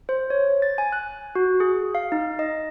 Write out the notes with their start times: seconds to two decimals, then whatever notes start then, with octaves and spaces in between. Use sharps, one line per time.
0.09 C5
0.30 C#5
0.62 A6
0.78 G#5
0.92 F#6
1.35 F#4
1.60 G#4
1.95 F5
2.12 D#4
2.39 D#5